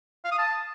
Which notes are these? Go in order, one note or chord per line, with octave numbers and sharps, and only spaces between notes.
F5
D#6
A5